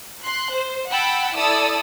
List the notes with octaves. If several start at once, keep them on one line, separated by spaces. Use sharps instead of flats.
C6 F#6
C5
F#5 G5 A5 B5 E6
E4 A4 D5 D#6 E6